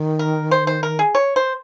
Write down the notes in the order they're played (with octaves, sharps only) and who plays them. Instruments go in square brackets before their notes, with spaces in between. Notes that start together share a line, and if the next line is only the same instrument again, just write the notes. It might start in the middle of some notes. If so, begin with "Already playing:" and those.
Already playing: [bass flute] D#3
[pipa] A#4
C5
C5
A#4
G#4
C#5
C5